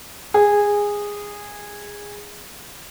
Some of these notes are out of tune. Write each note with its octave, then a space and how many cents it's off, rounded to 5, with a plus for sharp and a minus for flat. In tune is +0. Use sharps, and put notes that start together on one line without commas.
G#4 -15